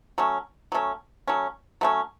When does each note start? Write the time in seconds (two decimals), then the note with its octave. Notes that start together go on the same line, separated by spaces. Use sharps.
0.18 F#3 A3 C#4
0.72 F#3 A3 C#4
1.27 F#3 A3 C#4
1.81 F#3 A3 C#4